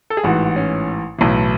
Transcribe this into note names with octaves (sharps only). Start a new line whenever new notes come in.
A4
G#4
A1 G#2 E3 F#4
C#4
B1 A2 E3